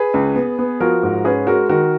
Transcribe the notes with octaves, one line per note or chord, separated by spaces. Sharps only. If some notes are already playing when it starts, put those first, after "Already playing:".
Already playing: G#4 B4
C#2
B3
B3
F3 F#4 A#4
G#2
C#4 G#4 B4
G#3 F#4 A#4
D#3 F#4 A#4